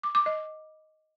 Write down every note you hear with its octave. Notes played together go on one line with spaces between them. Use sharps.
D6
D6
D#5